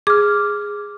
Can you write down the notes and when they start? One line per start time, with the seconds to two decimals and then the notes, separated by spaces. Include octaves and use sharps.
0.07 G#4 D6 F6